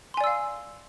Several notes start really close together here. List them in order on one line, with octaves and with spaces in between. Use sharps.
C6 G#5 D5 E6 F5